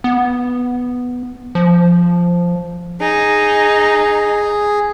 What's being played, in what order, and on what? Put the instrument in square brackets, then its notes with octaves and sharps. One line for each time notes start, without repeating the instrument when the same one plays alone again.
[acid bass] B3
F3
[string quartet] D#4 [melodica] G#4